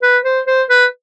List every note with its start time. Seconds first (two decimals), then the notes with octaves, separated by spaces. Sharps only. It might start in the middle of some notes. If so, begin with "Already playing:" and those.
0.03 B4
0.25 C5
0.47 C5
0.70 B4